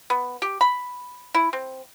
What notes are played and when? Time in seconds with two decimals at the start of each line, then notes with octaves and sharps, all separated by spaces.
0.10 B3
0.42 G4
0.61 B5
1.34 E4
1.53 C4